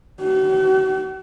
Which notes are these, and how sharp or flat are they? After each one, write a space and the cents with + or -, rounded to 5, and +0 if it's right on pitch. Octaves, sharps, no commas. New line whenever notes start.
F#4 +45